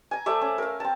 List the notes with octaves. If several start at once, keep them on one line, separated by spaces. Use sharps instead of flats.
G#5 A#5
A3 C5 D5 E5
C#4
A#4 F5
C4 A5